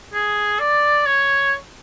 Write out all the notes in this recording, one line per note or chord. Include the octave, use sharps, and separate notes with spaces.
G#4
D5
C#5